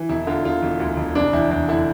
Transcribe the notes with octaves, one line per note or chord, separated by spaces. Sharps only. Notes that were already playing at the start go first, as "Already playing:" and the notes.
Already playing: E3
E1 E4
D3 F4
E1 F4
E1
D2
E1
F1 D4
E2 E4
E2 D4
D3 E4